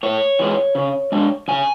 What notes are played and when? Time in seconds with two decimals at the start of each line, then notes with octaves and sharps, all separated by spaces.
0.03 A2 C#5
0.39 E3 G#3
0.75 C#3
1.12 G#3 D4
1.48 C#3 G#5